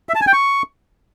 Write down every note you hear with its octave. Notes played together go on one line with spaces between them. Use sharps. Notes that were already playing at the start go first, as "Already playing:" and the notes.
E5
A5
G#5
G5
C#6